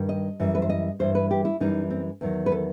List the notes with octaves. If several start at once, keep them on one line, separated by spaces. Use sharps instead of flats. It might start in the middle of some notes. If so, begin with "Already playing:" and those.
Already playing: G2 D#3 G3
D#5
F#2 E3 G3
B4
C5
D#5
G2 E3 G3 C5
B4
G4
E4
F#2 E3 G3 D#4
C4
E2 D#3 F#3
B4
A4